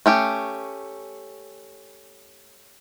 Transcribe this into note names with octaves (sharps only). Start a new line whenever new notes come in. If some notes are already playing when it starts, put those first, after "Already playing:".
A3 C#4 G4